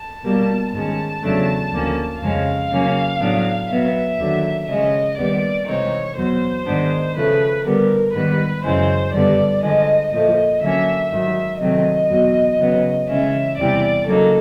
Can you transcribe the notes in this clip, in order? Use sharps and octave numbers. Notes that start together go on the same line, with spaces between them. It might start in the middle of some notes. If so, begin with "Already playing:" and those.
Already playing: A5
B2 G3 A#3
G#2 D#3 G#3 C#4 A5
E2 C#3 F#3 A3 D4
D2 D3 F3 A#3 C#4
F2 C#3 F3 G#3 C#4 F5
C#3 F#3 A#3 C#4
A2 F#3 B3 D4
B2 F#3 B3 E5
D#2 D3 F#3
C#3 F3 G#3 C#4 D#5
D#2 D#3 G3 B3 D5
C3 E3 G#3 C4 D#4 C#5
E2 B2 F#3 C5
G#2 D#3 G#3 B3 D4
C#3 F3 A3 B4
D3 G3 B3 A#4
G#2 D#3 G3 B3 B4
F#2 C#3 E3 G#3 C5
G2 D3 G3 B3 D5
D3 F3 G#3 D#5
A#2 F3 A3 D#5
D3 F#3 A#3 C#4 E5
G#2 D#3 F#3 E5
C3 D#3 F#3 A3 C4 D#5
E2 B2 F#3
C#3 F#3 B3
C#3 E3 G#3 C#4 E5
E2 C3 E3 G3 D5
C#3 F#3 A#3 D#4 A4